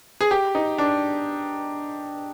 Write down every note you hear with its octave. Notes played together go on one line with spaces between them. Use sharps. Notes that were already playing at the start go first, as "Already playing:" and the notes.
G#4
G4
D#4
D4